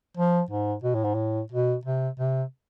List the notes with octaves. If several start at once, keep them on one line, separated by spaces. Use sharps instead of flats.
F3
G#2
B2
A2
G#2
A2
B2
C3
C3